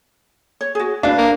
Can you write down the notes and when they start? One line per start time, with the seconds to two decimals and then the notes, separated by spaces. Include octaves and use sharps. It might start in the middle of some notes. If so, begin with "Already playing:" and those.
0.61 C#5
0.75 F#4 G#4
1.03 D4 B4 F5
1.18 A#3